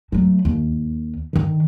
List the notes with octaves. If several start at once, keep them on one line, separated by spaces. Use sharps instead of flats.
F#3 A3
D#2
D3 D#3